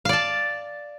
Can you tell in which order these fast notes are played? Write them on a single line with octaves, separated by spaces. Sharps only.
F5 D5 A5